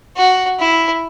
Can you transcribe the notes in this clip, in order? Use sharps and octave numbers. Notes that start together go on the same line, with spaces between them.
F#4
E4